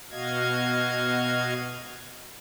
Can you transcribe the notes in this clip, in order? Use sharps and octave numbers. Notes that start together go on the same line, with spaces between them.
B2 F#4 D#5 F5 G#6